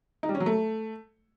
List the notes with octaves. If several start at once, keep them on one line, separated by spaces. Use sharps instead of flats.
D#4
G3
C#4
F#3
A3